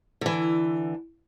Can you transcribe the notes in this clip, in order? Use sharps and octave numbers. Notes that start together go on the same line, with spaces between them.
D3 E3